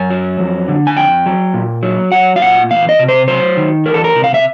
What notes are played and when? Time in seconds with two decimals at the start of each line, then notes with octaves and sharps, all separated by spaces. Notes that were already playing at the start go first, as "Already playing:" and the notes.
Already playing: F#2 G#5
0.10 F#3
0.39 F2
0.68 D3
0.87 G#5
0.96 F2 G5
1.26 F#3
1.54 A#2
1.83 F#3
2.12 F#3 F#5
2.36 F5
2.41 A#2 F#5
2.71 E2 F5
2.89 D#5
2.99 C3
3.08 C5
3.28 F#3 C5
3.57 D#3
3.85 E2 A#4
3.94 A4
4.04 A#4
4.15 C3
4.24 F5
4.34 E5